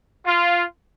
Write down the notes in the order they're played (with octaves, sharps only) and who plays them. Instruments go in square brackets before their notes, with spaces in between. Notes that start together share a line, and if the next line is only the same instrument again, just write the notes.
[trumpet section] F4